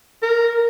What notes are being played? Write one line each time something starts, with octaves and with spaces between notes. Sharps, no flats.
A#4